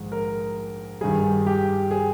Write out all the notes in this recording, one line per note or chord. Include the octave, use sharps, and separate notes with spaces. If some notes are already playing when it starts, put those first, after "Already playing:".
Already playing: A#1 G#2 D#3 G#3
A#4
G2 D#3 G3 G#4
G4
G#4